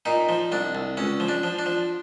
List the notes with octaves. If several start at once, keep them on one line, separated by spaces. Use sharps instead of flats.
A#2 D#4
F3
C2 D4
C2
C#2 C#4
F3
D4
F3
D4
F3